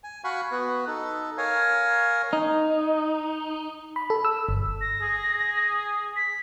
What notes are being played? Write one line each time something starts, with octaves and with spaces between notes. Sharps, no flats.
G#5
F#4 F5 F#5 G#5 B5 C#6
B3 F#4 B4
D#4 A4
A#4 C#5 F5 G#5
D#4
B5
A4
E6
G1
A#6
G#4
B6